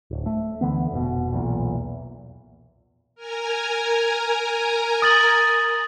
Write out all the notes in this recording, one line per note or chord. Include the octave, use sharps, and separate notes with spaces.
D1
A3
D2 D3 E3 B3
F1 B2
B1 E2 A#2
A#4 G#5 A#5
D#6 A6 F#7